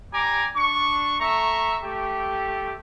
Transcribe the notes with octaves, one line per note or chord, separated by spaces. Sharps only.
G3 G#5 A#5 D6
D4 C#6
A3 E5 A#5 C#6
A3 G4